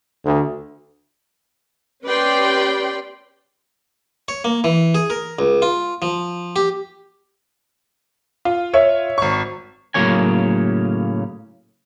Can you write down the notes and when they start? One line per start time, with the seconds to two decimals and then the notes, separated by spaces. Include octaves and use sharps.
0.24 D2
2.04 C#4 G4 B4 D5 G5 C6
4.28 C#5
4.45 A#3
4.64 E3
4.95 G#4
5.10 A#4
5.39 C#2
5.62 F4
6.02 F3
6.56 G4
8.45 F4
8.73 C#5 E5
9.18 G#1 C#6
9.94 A2 C#3 F#3 A#3 C#5 G#5